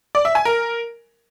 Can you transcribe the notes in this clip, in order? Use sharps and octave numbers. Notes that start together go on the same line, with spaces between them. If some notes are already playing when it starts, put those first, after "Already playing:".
D5
E5
G#5
A#4